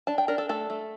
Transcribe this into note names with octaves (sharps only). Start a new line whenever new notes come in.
D4 A5
G5
D4 A#4
A4
A3 A4
A3